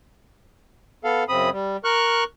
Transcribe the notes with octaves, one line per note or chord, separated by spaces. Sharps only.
B3 A4 F5
F#2 C#3 C4 B5 D#6
G3
A#4 C#6 F6 F#6